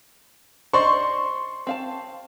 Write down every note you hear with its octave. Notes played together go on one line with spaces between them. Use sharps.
C5 D5 D#5 C6 C#6
C4 F5 A5